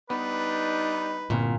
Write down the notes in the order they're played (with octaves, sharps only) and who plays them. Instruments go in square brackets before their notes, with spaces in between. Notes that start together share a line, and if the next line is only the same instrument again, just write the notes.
[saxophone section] G3 D4 D#4 [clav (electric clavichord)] B3 [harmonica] B4
[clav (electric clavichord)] G1 C2 [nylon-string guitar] A#2